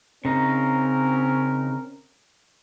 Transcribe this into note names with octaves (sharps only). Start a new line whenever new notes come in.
C#3 C4 C#4 D#4 A#4